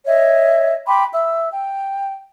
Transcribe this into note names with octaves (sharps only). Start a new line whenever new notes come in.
C#5 D#5 E5
G5 B5 C6 D6
E5 E6
G5